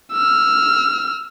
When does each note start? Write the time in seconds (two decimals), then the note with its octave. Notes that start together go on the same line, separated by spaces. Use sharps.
0.12 E6 F6